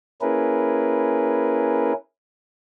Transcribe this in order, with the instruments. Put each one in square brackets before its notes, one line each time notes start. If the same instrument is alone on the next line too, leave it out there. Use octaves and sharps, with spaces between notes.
[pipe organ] A#3 C#4 E4 G#4 A#4 B4